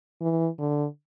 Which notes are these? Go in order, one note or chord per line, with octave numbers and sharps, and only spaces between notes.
E3
D3